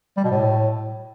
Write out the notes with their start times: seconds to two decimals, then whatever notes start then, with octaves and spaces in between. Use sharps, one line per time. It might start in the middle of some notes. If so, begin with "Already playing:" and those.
0.17 G3
0.24 B2
0.31 A2